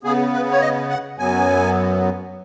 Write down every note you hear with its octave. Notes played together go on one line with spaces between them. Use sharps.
C#3 B3 G#4
B4
C#5
D#5
F#5
F#2 F#3 B3 G#5